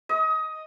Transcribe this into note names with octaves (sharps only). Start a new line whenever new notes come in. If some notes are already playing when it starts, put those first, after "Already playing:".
D#5